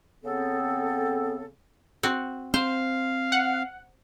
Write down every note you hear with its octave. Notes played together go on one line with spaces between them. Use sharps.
C#3 B3 C4 A4
C4 F#4
C4 C5 F5
F#5